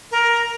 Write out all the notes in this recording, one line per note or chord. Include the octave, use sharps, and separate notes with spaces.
A#4